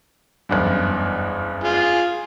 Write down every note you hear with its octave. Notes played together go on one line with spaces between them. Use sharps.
F#1 E2 G2
F4 G#4